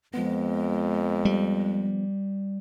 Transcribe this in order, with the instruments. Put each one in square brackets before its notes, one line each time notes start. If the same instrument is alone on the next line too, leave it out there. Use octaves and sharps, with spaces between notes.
[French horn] F2 [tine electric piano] F3 B3 [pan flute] G#3
[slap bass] G3